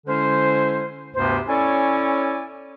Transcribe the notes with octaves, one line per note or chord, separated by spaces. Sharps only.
D3 G#3 C#4 E4 C5
D2 G2 C3 B3 C5
C#4 E4 A4 C#5 D5 G#5